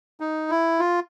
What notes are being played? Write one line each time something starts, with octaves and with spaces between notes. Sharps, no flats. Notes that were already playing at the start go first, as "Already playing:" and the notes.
D#4
E4
F4